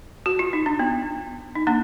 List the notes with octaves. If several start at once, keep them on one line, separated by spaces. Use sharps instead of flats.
F#4
F4
D#4
D4
B3
D#4
A#3 D4